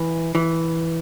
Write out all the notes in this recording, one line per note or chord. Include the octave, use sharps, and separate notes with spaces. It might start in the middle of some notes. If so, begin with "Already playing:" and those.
Already playing: E3
E3